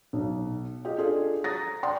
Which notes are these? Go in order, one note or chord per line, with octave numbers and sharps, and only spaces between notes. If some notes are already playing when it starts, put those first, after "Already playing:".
B1
F4 G4 G#4 D#5
D4 F4 G#4 A4
A#5 D#6 A6 A#6
D5 F#5 G5 C6 D#6